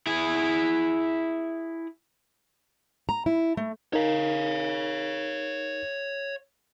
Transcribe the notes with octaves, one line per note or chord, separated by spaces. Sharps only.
E4 G#4
A#5
E4
A3
D#4 A#4 C#5 F5